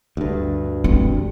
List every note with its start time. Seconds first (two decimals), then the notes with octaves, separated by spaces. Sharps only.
0.17 D2 G2
0.84 C4